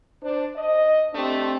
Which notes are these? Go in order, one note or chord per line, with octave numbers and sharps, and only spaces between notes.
D4 C5
D#5
A3 C4 D4 G4